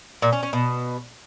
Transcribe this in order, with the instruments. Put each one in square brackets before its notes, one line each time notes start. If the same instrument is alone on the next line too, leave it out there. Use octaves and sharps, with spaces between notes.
[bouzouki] A#2
C#4
C#4
B2